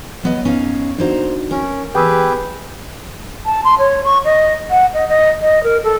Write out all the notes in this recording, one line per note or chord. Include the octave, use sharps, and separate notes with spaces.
F#3 B3 D#5
F#2 C#4 D#4 F5
A#3 D4 D#4 F#4 C5 A#5
C#4 A#4
E2 G4 G#4 B4 G5 D#6 E6
A5
C6
C#5
C#6
D#5
F#5
D#5
D#5
D#5
A#4
A4